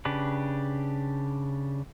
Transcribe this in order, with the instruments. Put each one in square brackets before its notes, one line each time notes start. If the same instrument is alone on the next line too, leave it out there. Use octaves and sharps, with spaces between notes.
[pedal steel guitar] C#3 D4 G4 B4